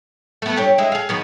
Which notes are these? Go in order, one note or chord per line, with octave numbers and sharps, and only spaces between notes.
A3 B3
G2 G4 C#5
G#3 E4
G#4 F5
D#3 F#3 B3